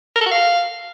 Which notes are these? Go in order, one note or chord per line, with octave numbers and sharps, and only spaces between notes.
A#4
A4
F#4
F5